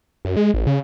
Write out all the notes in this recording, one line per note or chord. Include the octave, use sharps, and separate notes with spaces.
F#2
G#3
A1
C#3